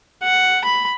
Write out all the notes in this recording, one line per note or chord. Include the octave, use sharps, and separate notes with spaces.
F#5
B5